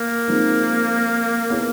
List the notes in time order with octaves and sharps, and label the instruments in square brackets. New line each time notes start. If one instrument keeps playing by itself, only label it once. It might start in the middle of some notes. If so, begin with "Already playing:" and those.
Already playing: [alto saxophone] A#3
[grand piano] F3 G#3 C4 D#4
B3 E4 G#4 C#5